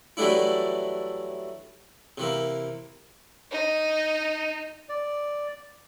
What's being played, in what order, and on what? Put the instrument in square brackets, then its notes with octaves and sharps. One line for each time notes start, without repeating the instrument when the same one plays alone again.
[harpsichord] E3 F#3 G3 A3 D4 E4
C3 E3 A#3
[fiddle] D#4
[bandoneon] D5